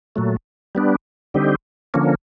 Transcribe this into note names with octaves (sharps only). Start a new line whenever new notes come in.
A#2 F#3 A3
G3 B3 D4
D3 G3 C4 D#4 G4
D3 F3 A#3 C#4